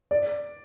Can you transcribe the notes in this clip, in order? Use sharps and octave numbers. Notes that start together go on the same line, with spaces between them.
D5